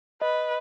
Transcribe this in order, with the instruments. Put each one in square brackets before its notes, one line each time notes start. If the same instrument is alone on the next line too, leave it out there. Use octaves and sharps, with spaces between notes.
[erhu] B4 [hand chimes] D#5